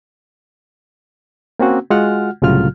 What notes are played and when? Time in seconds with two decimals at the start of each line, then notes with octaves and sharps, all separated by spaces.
1.59 A#3 C4 C#4 F#4
1.90 G#3 F4 F#4 F#5 F6
2.42 C2 A2 C#3 F#3 F4 F6